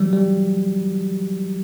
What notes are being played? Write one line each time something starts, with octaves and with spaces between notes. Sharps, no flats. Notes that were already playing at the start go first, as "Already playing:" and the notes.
Already playing: E3 F#3 G3
G3